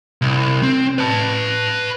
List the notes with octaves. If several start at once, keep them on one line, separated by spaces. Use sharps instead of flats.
C2
C4
B4 A5